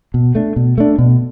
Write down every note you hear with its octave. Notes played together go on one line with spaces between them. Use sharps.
B2
A3 D4
B2
A3 D4
B2